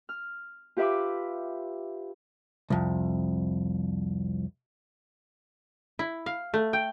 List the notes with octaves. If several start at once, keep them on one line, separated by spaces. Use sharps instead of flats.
F6
F4 G4 B4 E5 B5 D6
C2 F2
E4
F5
A3
G5